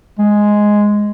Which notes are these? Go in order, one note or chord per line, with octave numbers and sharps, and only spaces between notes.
G#3